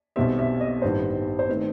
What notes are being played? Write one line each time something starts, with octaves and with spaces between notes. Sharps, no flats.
B1 B2 G3 C4 E5
E5
D#5
A1 G2 D#3 G3 B3 C5
C5
D#3 A3 C4 B4